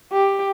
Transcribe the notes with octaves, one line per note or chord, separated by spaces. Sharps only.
G4